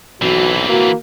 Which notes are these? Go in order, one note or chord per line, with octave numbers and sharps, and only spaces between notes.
B1 E3 C4 F#4
A#3 F#4